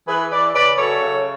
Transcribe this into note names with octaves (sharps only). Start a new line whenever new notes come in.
E3 G#4 B4
E3 B4 D5
C#3 B4 D5
F#2 A4 C#5
C#3